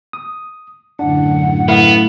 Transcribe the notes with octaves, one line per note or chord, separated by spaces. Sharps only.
D#6
F#2 A2 D3 D4 F#5
A3 B3 E4 F5